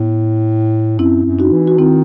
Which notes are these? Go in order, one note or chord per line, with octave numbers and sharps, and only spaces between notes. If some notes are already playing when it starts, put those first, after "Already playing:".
Already playing: A2 B3
F#2 C4 E4
F#2
D#4 F#4
E3
F#4
D#3 C4 E4